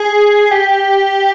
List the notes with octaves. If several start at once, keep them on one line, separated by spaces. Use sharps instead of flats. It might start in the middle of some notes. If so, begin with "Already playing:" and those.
Already playing: G#4
G4